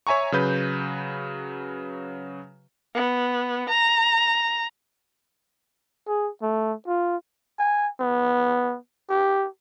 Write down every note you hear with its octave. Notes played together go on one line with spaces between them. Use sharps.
C#5 E5 G#5 A#5 C#6
C#3 F#3 B4 G6
B3
A#5
G#4
A3
F4
G#5
B3
G4